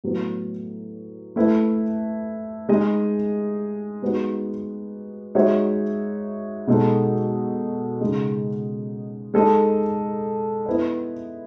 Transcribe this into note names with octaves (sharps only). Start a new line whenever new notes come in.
A2 F#3 B3
A3 E4 B4
G#3 D#4 G#4 D#5
G#3 B3 D#4 F#4
G#3 D#4 F#4 C#5 E5
B2 G#3 D#4 A4
C#3 G#3 D#4
G#3 D#4 A4 D#5
B3 E4 B4 D#5